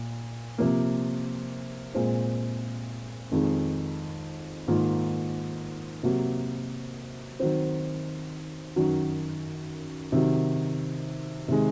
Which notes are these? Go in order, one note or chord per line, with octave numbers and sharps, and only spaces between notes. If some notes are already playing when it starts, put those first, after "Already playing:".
Already playing: A#2
C3 F3 A#3
A#2 G#3 C4
F2 D#3 G#3
G#2 D#3 A#3 F4
C3 F#3 A#3
D#3 F#3 C4
F#2 D#3 F#3
C3 D#3 F#3
C3 D#3 G#3